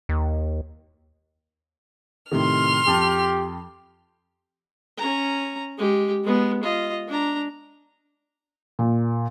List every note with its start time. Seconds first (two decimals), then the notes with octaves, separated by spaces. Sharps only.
0.09 D#2
2.32 A2 C3 D#3 C6 F6
2.87 F2 G4 A5
4.97 C#4 A#5
5.78 G#3 G4
6.24 G#3 B3
6.63 F4 D#5
7.08 D4 A#5
8.79 A#2